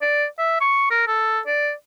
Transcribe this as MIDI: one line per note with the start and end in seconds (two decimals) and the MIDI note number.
0.02 0.25 74
0.38 0.58 76
0.61 0.86 85
0.90 1.07 70
1.07 1.40 69
1.46 1.72 74